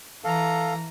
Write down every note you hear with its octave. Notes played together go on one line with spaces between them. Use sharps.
E3 A4 F5 A#5